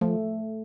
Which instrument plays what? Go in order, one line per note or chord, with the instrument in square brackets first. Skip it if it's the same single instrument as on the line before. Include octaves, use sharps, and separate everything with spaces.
[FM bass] F3 [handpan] A3